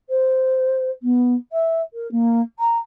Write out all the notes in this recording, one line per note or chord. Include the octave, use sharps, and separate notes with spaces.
C5
B3
E5
A#4
A#3
A#5